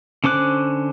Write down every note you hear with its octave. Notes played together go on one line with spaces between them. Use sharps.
D3 C#4 C5 D6 F#6